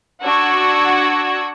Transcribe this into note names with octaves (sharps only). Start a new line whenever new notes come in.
D4 F#4 F#5 E6 G#6